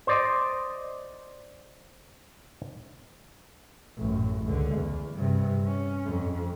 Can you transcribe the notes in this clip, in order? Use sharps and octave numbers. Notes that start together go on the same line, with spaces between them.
C5 D5 D#5
A1 F#2
C#2 D3
E2
G2 C3
C#4
F2